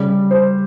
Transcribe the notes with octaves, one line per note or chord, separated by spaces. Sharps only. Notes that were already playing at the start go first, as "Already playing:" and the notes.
Already playing: C#3 G3
C5